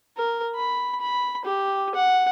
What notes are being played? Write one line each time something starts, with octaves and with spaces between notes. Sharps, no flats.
A#4
B5
B5
G4
F#5